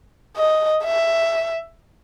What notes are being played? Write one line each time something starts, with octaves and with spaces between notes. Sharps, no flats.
D#5
E5